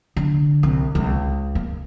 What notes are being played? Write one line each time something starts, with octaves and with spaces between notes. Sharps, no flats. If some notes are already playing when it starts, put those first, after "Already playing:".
D3
C2
C#2
A#3